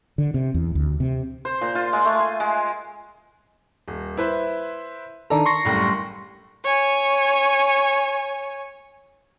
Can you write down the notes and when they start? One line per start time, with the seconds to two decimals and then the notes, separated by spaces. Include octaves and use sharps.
0.18 D3
0.34 C3
0.54 E2
0.75 D2
1.00 C3
1.45 C5
1.61 A#2
1.75 F4
1.93 G#3
2.05 A3
2.20 G#5
2.40 G#3
3.88 D#1
4.17 E4 B4 C5
5.30 D#3 D4 A4 A#5
5.45 C6 C#6 A#6
5.65 F#1 A2 G3
6.64 C#5 G#5